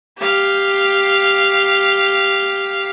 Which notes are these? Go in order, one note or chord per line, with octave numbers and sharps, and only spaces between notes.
G4 F5